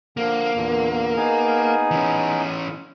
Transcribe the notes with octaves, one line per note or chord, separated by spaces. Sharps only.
D3 F3 A#3
E2 A#2 D3
B3 D#4 G#4
E3 C#4